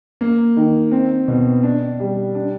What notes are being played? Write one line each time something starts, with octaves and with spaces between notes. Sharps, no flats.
A#3
D#3
C4
B2
D4
G3
D4